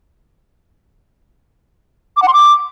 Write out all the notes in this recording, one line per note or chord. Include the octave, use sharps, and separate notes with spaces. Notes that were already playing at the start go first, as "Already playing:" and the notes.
D6
F#5
C6
D6